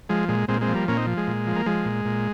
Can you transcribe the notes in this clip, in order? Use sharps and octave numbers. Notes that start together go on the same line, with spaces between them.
F3 G#3
A#2 G#3
A#2 G#3 C4
G#3 C4
F3
G3 A#3
A#2 A#3 C#4
C4 D#4
F3
G#3
A#2
F3
A#3
F3 G#3
A#2
A#2